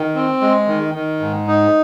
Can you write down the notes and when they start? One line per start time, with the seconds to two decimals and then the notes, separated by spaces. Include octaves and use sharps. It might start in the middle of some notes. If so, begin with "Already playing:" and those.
Already playing: D#3
0.15 C4
0.41 G#3
0.68 D#3
0.94 D#3
1.20 G#2
1.47 D#4